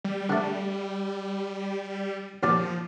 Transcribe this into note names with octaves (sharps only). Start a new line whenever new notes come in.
G3
D3 A3
D#2 A#2 F3 D5